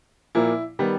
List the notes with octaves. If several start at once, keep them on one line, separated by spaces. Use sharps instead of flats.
A#2 F3 A#3 E4
D#3 G3 B3